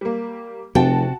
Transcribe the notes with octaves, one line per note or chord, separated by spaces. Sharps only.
G3 A#3
F1 C3 F#4 G5 A5